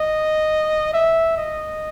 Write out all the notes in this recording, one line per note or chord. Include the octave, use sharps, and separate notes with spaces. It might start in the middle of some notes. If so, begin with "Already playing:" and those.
Already playing: D#5
E5
D#5